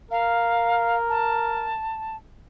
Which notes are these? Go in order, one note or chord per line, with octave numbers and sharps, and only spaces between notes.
A#4 F5
A5